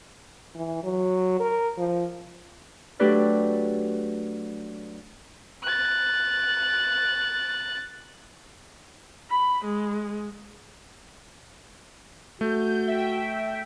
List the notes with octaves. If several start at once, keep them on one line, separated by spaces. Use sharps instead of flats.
E3
F#3
A#4
F3
F#3 A3 D4 G4 B4 D5
F#6 A6
B5
G#3
A3 F#4 G6
E5 G5